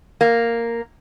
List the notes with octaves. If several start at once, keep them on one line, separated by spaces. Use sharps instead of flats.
A#3